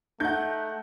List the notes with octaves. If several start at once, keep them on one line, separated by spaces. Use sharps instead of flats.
A3 D#4 F#5 G6